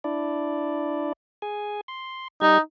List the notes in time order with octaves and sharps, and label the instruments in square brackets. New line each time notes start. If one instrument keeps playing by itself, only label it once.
[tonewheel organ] D4 E4 D5
G#4 G#5
C6
[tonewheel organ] G3 G4 G#6 [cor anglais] D#4